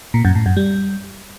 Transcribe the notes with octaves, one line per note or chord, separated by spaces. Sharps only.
A#2
F#2
A2
F#2
G3